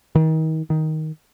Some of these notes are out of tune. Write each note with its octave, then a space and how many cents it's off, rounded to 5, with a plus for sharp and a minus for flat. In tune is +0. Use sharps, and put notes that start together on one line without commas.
D#3 +35
D#3 +10